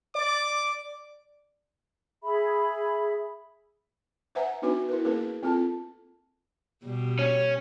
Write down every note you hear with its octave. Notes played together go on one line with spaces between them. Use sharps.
D5 D6
G#4 E5 B5
B4 C5 E5 F#5 G#5 A#5
B3 D4 D#4 F#4 B4 G#5
E4 A#4 B4
A#3 C#4 G#4 A#4 B4
C4 F4 A4 A5
B2 G3
C#4 C#5